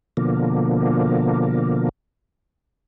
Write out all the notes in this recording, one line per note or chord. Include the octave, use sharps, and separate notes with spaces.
B2 D3 F3 A#3